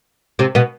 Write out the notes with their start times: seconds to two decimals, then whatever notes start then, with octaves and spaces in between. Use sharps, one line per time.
0.39 C3 C4
0.55 B2 B3